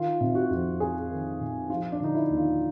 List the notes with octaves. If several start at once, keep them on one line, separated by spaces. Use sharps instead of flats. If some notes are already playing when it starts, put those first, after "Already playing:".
Already playing: D#3 F4
C3
F#4
F2
F2 G#4
D#3
C3
F3 F4
D4
D3 D#4
E4
D#2
F4